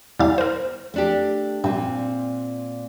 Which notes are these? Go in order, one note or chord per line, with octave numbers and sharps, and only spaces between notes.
E2 G3 F5
A#4 C5
A3 D4 G4
G2 A#2 C4